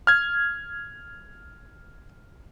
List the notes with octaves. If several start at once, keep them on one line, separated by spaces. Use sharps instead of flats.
F6 G#6